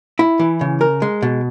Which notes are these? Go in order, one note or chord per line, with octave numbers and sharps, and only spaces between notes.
E4
E3
C#3
A#4
G#3
B2